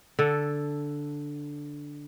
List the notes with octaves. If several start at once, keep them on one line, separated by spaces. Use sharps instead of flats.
D3 A4